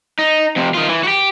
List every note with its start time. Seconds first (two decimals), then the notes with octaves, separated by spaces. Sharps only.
0.19 D#4
0.56 F2 C3
0.74 D#3 F4
0.89 E3
1.03 F#4 G4